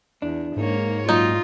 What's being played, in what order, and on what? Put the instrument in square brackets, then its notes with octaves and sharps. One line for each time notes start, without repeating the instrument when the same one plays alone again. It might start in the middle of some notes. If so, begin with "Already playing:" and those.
[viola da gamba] E2 [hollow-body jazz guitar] D4
[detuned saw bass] G#2 [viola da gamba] A#3 C#5
[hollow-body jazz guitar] F#2 A#2 F#3 [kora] D#4 [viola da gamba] F4